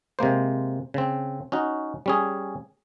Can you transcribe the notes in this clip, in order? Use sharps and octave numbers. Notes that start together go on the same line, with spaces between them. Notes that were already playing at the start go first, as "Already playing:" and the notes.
C3 G#3 A#3 C5
C#3 C4
C#4 D#4 F#4
G3 C#4 G#4